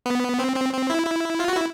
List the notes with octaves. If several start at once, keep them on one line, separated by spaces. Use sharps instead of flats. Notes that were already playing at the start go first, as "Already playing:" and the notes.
B3
C4
C4
C4
E4
E4
F4
F#4
E4